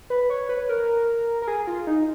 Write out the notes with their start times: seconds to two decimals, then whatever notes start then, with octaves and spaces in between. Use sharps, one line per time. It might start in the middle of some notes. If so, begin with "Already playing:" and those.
0.10 B4
0.30 C#5
0.49 B4
0.69 A#4
1.42 A#4
1.48 G#4
1.67 F4
1.87 D#4